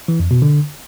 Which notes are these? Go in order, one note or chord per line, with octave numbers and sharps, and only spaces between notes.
E3
F2
B2
D3